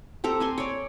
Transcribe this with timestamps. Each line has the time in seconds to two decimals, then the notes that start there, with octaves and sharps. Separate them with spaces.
0.24 C4 G4 A4 A#5
0.40 C4 G#5 C6
0.58 C#5 D5